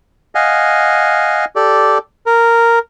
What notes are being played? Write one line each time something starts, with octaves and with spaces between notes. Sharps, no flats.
D#5 F5 F#5 G#5
G4 A4 D5
A#4